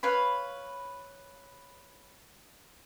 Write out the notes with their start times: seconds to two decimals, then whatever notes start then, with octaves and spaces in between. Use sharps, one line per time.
0.03 B4 C#5 F5 B5